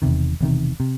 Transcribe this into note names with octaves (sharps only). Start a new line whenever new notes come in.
E1 E2 C3 D#3
E1 E2 C3 D#3
C3